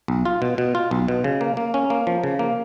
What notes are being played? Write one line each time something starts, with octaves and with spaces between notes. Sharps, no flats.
B1
F4
B2
B2
F4
B1
B2
C#3
A#3
A#3
C#4
A#3
F3
C#3
A#3